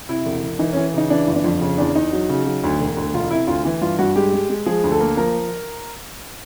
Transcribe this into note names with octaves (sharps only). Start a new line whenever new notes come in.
C3 E4
E1
E1
E3 D#4
C#4
E3
C#3 D#4
E3 D4
G1
D4
F2
C#3
E2 D4
E2 D#4
F#3
C#3
F#3
D2
E1
D2
E1 F4
C3 E4
D2 F4
E3
G2 F4
G2 F#4
G#3 G4
G#3
G#3
F3 G#4
D2
A4
A#3
F3 A#4